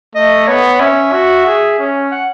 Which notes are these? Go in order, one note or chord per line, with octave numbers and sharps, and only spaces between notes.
A3 D#5
B3 C#5
C#4 E5
F#4
G#4
C#4
F#5